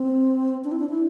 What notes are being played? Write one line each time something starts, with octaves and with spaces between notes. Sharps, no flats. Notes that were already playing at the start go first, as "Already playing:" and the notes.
Already playing: C4
D4
E4
D4
E4